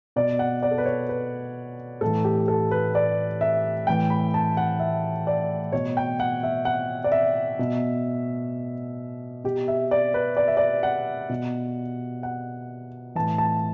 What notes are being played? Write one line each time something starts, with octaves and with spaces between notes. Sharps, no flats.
B2 D5
F#5
D5
A4
B4
C#5
B4
A2 E3 A4
G4
A4
B4
D5
E5
A2 E3 G5
B5
A5
F#5
E5
D5
B2 C#5
G5
F#5
E5
F#5
D5
E5
B2
B2 G4
E5
D5
B4
D5
E5
D5
F#5
B2
F#5
A2 E3 A5
A5